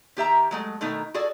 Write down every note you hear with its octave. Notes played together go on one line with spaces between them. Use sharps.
D#3 G4 E5 A#5
F#3 G#3 A3
B2 D#3 A3 D#4
F#4 G#4 A4 D5